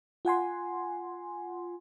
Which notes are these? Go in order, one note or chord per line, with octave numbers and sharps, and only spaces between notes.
F4 F#5 G#5 C6